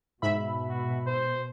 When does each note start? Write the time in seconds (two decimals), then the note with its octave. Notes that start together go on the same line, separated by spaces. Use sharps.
0.22 G#2 B2 E5 B5
0.69 F#4
1.07 C5